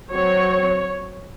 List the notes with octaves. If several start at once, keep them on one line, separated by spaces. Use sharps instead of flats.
F#3 C4 C#5